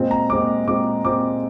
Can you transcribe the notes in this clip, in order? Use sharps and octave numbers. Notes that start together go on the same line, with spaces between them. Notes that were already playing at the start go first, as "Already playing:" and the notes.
Already playing: A#2 G#3 C4 F4
A#5
A#2 G#3 C4 F4 D6
A#2 G#3 C4 F4 D6
A#2 G#3 C4 F4 D6